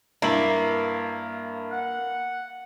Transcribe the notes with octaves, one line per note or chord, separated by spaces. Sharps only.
G2 A#3 E4 F#7
F#5